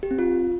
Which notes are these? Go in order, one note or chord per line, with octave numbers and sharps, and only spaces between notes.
G4
C4
F4